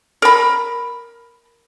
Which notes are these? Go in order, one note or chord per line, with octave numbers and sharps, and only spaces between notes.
A#4 B5